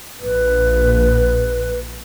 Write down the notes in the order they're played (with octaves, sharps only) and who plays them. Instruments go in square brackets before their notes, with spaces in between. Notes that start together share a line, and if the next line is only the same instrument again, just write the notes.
[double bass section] A#1 [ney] B4